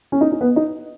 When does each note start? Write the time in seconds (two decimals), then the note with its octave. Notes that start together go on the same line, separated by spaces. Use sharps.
0.12 C#4
0.21 D#4
0.32 D#4
0.41 B3
0.56 D#4